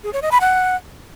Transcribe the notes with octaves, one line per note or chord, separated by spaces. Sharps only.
G#4
C#5
D#5
B5
F#5